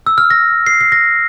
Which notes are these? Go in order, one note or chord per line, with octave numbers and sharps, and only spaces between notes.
E6
F6
A#6
C7
C7
A#6